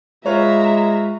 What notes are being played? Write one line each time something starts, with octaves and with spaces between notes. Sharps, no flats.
G#3 F4 B4 C#5 E5 A#5